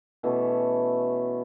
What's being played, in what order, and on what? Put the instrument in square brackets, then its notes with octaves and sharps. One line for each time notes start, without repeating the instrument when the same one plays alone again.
[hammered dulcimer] B2 E3 A3 C#4